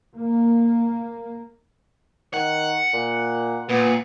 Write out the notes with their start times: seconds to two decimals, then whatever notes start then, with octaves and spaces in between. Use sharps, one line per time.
0.15 A#3
2.34 D#3 F#5
2.93 A#2
3.69 A#2 B3